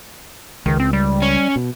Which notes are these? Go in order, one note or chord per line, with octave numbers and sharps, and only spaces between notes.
C#2 D#3
C4
G3
C#4
B2